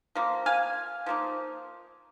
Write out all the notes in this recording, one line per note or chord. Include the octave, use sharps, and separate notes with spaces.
F3 A#3
F5 G#5
F3 A#3 D#4